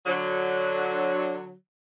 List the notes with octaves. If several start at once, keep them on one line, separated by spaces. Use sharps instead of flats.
D3 F#3